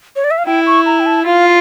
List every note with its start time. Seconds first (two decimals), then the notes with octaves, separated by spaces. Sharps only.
0.16 C#5
0.24 D5
0.31 E5
0.38 F5
0.46 E4 G5
0.67 C#6
0.86 A#5
1.00 G5
1.06 A5
1.26 F4 F5